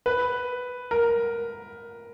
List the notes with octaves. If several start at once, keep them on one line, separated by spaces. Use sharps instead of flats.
B4
A#4